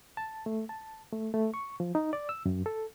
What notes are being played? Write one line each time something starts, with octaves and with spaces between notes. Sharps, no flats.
A5
A3
A5
A3
A3
C#6
F3
D#4
D5
E6
F#2
A4